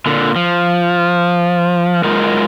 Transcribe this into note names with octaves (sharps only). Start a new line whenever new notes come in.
A#2 D3
F3
F#3 G#3 D#4 F4 A#4